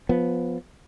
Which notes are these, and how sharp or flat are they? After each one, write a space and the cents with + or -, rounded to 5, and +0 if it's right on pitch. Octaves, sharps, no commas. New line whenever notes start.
F3 +15 B3 +0